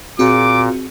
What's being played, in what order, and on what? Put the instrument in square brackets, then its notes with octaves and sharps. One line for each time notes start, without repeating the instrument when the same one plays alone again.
[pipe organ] A#2 [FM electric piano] C4 F#4 G#4 [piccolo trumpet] D6